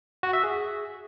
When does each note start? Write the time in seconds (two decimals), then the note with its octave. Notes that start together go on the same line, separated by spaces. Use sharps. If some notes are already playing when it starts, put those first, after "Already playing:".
0.23 F#4
0.33 E5
0.44 G#4